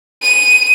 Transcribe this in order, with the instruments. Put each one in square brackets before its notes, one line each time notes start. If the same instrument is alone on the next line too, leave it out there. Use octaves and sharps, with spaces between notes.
[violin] D#7